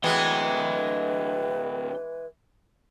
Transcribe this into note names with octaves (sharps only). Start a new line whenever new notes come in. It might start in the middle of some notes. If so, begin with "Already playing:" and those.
D2 A2 E3 G#3 B3 B4 D#5 G5